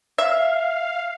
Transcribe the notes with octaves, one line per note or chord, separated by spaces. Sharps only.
E5 F5